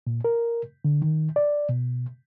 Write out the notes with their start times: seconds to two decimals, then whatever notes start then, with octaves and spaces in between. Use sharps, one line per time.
0.07 A#2
0.25 A#4
0.85 D3
1.02 D#3
1.36 D5
1.69 B2